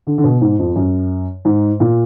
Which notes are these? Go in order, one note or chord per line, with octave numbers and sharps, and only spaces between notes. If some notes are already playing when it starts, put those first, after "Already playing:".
D3
D3
B2
G#2
F2
F#2
G#2
A#2